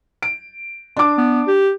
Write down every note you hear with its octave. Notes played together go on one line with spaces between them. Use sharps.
D7
D4 D6
B3
G4